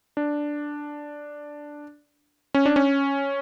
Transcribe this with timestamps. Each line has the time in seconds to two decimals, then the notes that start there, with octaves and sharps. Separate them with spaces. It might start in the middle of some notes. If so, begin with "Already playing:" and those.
0.17 D4
2.54 C#4
2.66 D4
2.76 C#4